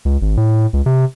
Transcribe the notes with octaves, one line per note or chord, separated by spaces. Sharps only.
C#2
G#1
A2
C#2
C3